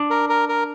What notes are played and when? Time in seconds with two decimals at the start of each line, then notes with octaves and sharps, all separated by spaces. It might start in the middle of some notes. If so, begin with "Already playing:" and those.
Already playing: D4
0.10 A#4
0.29 A#4
0.49 A#4